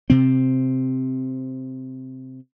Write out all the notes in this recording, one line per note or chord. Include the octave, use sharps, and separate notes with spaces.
C3 C4